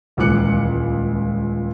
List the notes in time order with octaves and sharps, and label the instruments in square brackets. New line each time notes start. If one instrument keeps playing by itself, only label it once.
[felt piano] D#1 C#2 E3 D6 F#6 C#7